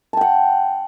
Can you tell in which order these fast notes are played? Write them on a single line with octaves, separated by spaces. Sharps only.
A5 G5 F#5